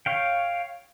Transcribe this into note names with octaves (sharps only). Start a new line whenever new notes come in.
C#5 F5 G5